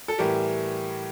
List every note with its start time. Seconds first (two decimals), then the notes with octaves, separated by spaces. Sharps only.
0.08 A4
0.18 A2 E3 G3 G4 A#4